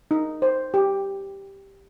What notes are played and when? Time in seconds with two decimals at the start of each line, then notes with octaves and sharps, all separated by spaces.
0.11 D#4
0.42 C5
0.74 G4